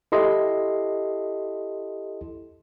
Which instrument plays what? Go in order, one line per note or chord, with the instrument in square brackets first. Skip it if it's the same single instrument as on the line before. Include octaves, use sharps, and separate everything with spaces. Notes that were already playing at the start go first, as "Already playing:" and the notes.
[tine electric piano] E4 G4 A4 D#5 C6